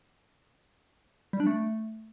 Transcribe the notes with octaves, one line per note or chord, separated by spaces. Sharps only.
G3
D4
A3